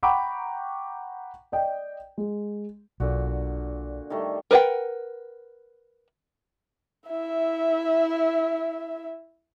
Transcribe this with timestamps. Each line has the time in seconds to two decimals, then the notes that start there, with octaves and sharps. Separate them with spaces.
0.03 F#5 G5 A#5 B5 C#6 D6
1.52 D5 D#5 G5
2.18 G#3
3.00 B1 A#2 D3 F#4
4.10 D#3 G3 A3
4.51 A#4 B4 D5 F#5 G5
7.10 E4 E5